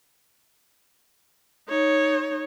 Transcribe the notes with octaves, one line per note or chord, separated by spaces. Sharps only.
D#4 C#5